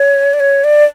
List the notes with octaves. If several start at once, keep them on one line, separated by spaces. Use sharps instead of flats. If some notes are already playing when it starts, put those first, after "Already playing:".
Already playing: C#5
D5
C#5
D5